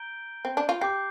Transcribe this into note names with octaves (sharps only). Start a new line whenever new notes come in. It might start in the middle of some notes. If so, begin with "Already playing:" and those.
Already playing: A#5 G6 D7 G7
C4
D4
F4
G4 D6 G6 C7